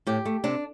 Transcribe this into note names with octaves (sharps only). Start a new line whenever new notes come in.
A2 G4
A3
C3 D4